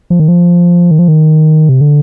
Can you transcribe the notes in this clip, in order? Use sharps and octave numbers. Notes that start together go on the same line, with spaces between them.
F3
D#3
F3
D#3
F3
D#3
C3
D3